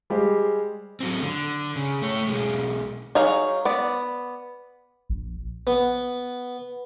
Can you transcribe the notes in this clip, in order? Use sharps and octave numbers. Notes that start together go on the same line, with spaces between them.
G3 G#3 G4 C5
F#3 C4
D3
C#3
A3 C#5
B1 G#3
F#3 D#4 G#4 F5
B3 D5
A#1
B3